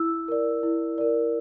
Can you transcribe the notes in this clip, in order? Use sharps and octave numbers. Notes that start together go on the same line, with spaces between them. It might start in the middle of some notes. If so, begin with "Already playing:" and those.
Already playing: E4 E6
A#4 D5
E4
A#4 D5